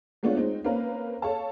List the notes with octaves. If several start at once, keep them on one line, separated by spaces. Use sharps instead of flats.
G#3 A3 B3 D4 F4 C#5
G#3 C4 D#4
A#3 C4 C#4 A#4 B4 F5
A4 C#5 F5 A5